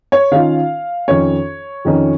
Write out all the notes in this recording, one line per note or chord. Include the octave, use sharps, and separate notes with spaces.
C#5
D#3 C#4 F4 F5
F2 D#3 C#4 C#5
F2 D#3 C#4